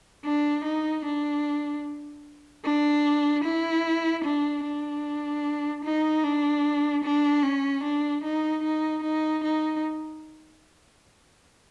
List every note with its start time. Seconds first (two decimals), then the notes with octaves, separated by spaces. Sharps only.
0.25 D4
0.64 D#4
1.05 D4
2.65 D4
3.44 E4
4.24 D4
4.64 D4
5.84 D#4
6.24 D4
7.04 D4
7.43 C#4
7.84 D4
8.24 D#4
8.63 D#4
9.03 D#4
9.44 D#4